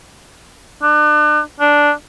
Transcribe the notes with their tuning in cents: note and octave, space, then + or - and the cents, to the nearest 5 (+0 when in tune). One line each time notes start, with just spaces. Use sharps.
D4 +35
D4 -5